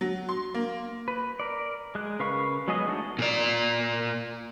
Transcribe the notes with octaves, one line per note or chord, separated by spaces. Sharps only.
F#3
C6
A#3
B4
A#4 D5
G#3 F#6
C#3 A#4 B4 F5 C#6
F#3 G#3 B3 G#4 D#5
A3 D4 D#4 F#4
A#2 D5